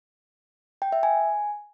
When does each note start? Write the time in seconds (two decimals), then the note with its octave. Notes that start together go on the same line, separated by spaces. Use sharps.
0.82 G5
0.92 E5
1.03 G#5